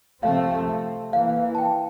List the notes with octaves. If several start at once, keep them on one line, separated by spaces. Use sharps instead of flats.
C3 F3 A3 C4 F5
E3 A#3 F5
A5
G5